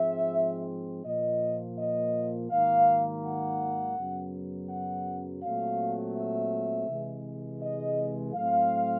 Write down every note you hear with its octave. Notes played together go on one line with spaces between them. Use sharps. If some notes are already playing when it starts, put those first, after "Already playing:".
Already playing: G#2 F3 G#3 C4 E5
A#2 F3 A#3 D#5
D#5
G#2 D#3 F#3 A#3 F5
F#5
F#2 C#3 F#3 B3
F#5
A#2 F#3 A3 C4 F5
E5
C3 E3 G#3
D#5
A2 F#3 A3 C4 F5